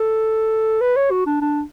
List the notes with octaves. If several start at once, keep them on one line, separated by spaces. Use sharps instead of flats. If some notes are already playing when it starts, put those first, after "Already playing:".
Already playing: A4
B4
C#5
F#4
D4
D4